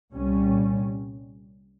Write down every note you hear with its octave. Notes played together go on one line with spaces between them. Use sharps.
C2 A#2 G3 C#4